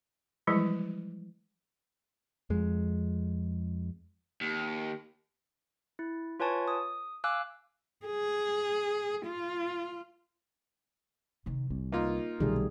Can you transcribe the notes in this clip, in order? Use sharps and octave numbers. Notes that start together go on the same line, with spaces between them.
E3 F3 G3 G#3 E4
F2 G#3
D#2
E4
F4 B4 C#5 G#5 A5 C#6
D#6
F5 G#5 D6 E6 F#6
G#4
F4
C3 D#3
C2 D3
A#3 D#4 F4
C2 B2 D#3 F#3 G3 A3 G#4